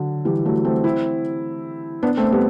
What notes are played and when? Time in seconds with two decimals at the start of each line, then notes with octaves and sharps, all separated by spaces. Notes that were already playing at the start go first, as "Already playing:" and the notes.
Already playing: D3 F#3
0.25 E3 G3
0.45 F#3 A3
0.64 A3 C4
0.84 C4 E4
2.03 B3 D4
2.17 A3 C4
2.32 G3 B3